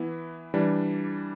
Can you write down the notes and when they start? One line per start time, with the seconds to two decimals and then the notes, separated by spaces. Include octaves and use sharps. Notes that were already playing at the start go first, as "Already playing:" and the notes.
Already playing: E3 B3 E4
0.54 E3 G3 D4